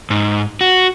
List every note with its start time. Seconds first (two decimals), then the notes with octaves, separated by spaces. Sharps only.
0.10 G#2
0.61 F#4